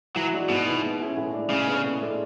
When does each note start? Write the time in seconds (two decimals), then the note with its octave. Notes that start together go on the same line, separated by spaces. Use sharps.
0.16 E3 F#3
0.33 G#3 D4 F#4
0.49 G#2 B2
0.66 E3 B3
0.83 G#3
1.00 C#4 E4 G#4
1.17 A2
1.34 G#3 D4
1.50 C#3 G#3
1.67 B3 D4 G#4 B4
1.84 A2
2.01 G#3 D4 A4 D5